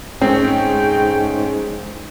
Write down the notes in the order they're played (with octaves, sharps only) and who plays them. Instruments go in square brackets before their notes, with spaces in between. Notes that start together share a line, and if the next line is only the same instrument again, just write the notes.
[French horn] G#2 [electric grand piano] G#3 A3 C#4 [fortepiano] C4 [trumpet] G5